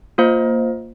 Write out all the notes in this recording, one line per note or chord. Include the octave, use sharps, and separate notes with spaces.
A#3 F4 C5 F5